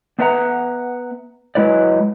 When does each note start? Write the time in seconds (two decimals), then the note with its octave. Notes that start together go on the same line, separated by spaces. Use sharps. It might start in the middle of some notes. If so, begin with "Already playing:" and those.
0.19 B3 D4 B4 E5 F#5 A#5
1.55 F#3 G#3 E4 B4 D5